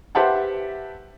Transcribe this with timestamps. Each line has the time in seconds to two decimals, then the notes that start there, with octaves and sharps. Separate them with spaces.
0.15 G4 B4 C5 E5 F#5 A5